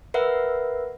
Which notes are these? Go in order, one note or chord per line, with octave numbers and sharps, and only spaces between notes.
A#4 B4 E5 F#5